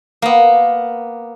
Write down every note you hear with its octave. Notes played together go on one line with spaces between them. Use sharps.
A#3 B3